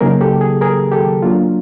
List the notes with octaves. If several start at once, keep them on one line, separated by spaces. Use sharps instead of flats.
C#3 F#3 A#3 D#4 G#4 A#4
G4 A4
G#4
G#4 A#4
G4 A4
F#3 A#3 D4 F4